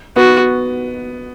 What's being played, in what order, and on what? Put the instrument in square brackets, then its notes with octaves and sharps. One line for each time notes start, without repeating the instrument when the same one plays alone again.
[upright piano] B3 [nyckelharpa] F#4